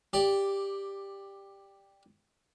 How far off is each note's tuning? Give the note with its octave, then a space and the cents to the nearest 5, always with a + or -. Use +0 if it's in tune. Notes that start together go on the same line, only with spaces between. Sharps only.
G4 +10 D5 +0